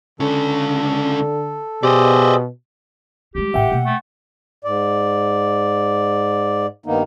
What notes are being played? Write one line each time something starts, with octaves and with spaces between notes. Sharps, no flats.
C#2 D3 C#4 A4
B2 G4 G#4 C5 D5 D#5 E6
G3 G#3 G4
A1 A2 E5 F#5 G5
B2 A#3
A3
G#2 D5
G2 D#3 A#3 B3 D#4